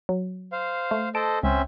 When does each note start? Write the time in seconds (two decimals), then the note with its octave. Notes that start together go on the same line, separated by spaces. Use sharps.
0.09 F#3
0.52 C5 F5
0.91 A3
1.15 A4 C5 D#5 A5 D7
1.43 C#2 C4 C#4 E5